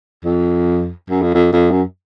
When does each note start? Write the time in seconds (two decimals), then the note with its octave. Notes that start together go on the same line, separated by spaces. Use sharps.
0.25 F2
1.10 F#2
1.22 F2
1.34 F2
1.52 F2
1.71 F#2